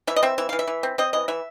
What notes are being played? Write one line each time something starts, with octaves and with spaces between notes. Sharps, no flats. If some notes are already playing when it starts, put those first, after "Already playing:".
E3 E5
D#5
C4 E5
E3 E5
E3 F5
E5
E3
C4
C4 D#5
E3 D#5
E3 E5